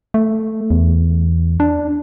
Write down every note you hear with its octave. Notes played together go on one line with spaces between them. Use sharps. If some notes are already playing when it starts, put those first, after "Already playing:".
A3
E2
D4